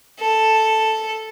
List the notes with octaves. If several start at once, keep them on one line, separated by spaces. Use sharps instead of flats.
A4